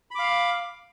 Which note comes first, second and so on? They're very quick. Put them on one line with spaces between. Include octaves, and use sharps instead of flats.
B5 D6 F5